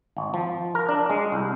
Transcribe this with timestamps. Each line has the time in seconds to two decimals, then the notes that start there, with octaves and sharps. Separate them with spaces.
0.17 G#1
0.34 F3
0.75 A#4
0.89 D4
1.10 G#3
1.32 C2